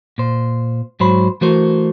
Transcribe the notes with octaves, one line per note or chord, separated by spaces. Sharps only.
A#2 C5
G#2 F#3 C5 B5
E3 A3 F#4 A#4 C5